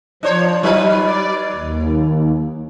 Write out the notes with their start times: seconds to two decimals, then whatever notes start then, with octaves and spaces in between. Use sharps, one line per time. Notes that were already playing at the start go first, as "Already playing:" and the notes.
0.23 F3 D4 C5 C#5
0.63 F#3 D#4 B4
0.99 D5
1.56 D#2